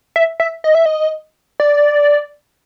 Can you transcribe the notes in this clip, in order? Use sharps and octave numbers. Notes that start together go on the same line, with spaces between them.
E5
E5
D#5
E5
D#5
D5